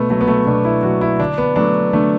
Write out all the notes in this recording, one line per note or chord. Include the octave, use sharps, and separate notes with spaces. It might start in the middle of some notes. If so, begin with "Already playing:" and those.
Already playing: B2 A3 B3
F#3 A3
B3
A3
B2 D4
E4
F#3 A3 F#4
E4
D3 D4
B3
F#3 A3 D4
D3 A3